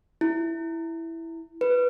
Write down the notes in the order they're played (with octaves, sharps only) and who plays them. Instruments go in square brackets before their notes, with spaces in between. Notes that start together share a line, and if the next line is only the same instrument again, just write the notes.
[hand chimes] E4
B4